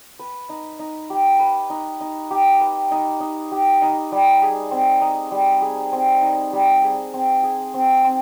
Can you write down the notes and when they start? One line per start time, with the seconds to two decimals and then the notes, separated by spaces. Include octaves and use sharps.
0.19 B4
0.49 D#4
0.79 D#4
1.10 G4
1.39 B4
1.70 D#4
2.01 D#4
2.31 G4
2.60 B4
2.91 D#4
3.20 D#4
3.52 G4
3.82 D#4
4.12 G3
4.42 G#4
4.71 C4
5.01 D#4
5.32 G3
5.62 G#4
5.93 C4
6.22 D#4
6.53 G3
6.83 G#4
7.14 C4
7.43 G#4
7.74 C4
8.04 C4